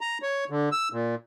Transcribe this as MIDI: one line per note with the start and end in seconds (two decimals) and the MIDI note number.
0.01 0.18 82
0.22 0.44 73
0.50 0.69 50
0.72 0.89 88
0.93 1.15 46